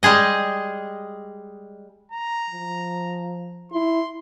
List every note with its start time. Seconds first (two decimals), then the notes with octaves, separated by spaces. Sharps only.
0.03 G3 G#3 G#4 D#5
2.12 A#5
2.50 F3
3.72 E4 C6